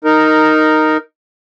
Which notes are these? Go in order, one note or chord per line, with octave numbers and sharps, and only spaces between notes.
D#4 A#4